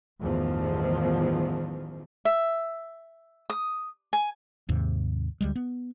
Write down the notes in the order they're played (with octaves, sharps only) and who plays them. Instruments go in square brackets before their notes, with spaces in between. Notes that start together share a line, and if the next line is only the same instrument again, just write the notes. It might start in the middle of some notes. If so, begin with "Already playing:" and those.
[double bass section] A1 E2 G2 D#3 F3
[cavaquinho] E5
D#6
G#5
[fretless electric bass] D#2 G#2 C3
D2 G3 G#3
B3